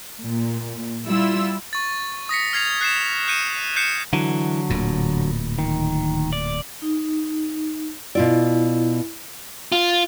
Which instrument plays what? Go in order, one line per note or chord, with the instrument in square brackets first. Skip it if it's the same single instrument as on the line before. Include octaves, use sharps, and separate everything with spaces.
[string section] A#2
G3 E4 F4 E6
[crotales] C#6 A6
D#6 A#6 B6 C#7
F6 G#6 C7 F7
F#6 C7 E7
F#6 G6 C#7 D#7 E7
F#6 G6 C7 C#7 E7
[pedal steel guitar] D3 F#3 [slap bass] E3
[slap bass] D1 A#2
[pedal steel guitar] D#3
D5
[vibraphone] D#4
[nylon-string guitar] B2 F4 D5 [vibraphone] E4
[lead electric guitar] F4